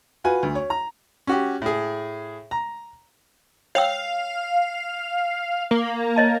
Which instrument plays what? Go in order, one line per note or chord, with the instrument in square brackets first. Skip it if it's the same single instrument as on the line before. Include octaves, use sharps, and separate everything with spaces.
[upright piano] F4 F#4 B4 G#5
D2
C#5
A#5
[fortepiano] C#4 F#4 G4
A2 G#4
A#5
[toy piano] C#5 G5 E6 [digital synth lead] F5
[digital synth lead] A#3
[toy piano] C#5 D#5 A5